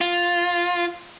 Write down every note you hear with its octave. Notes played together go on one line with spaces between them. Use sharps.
F4